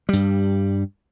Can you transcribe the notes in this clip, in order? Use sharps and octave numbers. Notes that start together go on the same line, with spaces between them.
G2 G3